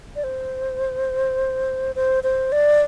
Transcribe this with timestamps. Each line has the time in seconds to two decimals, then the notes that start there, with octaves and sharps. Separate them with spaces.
0.16 D5
0.24 C5
1.96 C5
2.23 C5
2.52 D5